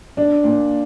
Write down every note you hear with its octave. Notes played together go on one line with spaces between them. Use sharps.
D4
A#2